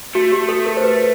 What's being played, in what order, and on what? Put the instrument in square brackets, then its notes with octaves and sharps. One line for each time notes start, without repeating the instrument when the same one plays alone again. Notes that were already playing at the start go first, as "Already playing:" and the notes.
[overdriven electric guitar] A3 [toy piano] F#4
[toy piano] G4
A4
A#4
C5
B4